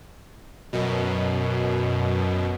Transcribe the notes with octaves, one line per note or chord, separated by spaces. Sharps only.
F#2 B2